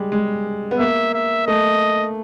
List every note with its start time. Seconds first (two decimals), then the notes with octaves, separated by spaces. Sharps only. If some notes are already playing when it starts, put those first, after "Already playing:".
Already playing: G3 G#3
0.12 G#3
0.71 B3
0.79 A#3 E5
1.14 E5
1.47 A3 D#5